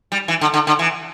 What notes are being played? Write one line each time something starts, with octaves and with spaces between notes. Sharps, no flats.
G3
E3
D3
D3
D3
E3